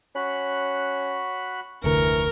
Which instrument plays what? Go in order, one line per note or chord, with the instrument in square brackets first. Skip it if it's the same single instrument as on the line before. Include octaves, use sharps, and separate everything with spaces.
[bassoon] C#4 [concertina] F#4 B5 F#6
[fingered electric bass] F1 D2 D3 [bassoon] E3 [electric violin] A#4 [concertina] C#6